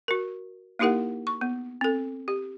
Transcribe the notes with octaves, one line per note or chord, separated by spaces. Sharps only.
F#4 A#4
A#3 D#4 E4 G4 A#4 F#5
C#6
B3
C4 A4
G4